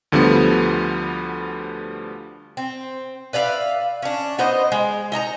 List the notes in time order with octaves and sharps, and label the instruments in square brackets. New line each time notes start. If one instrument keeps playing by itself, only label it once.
[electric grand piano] D2 D3 F3 G3 B3
[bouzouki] C4
B4 D5 E5 F5
C#4 D4
B3 D#4 C5 D#5
G#3
D#4 D#5 A5 A#5